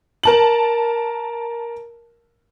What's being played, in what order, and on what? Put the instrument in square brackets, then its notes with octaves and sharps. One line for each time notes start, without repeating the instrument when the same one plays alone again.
[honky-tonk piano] A#4 A5 F#7